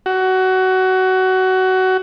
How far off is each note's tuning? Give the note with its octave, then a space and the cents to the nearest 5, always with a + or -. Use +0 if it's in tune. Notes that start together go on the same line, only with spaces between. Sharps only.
F#4 +20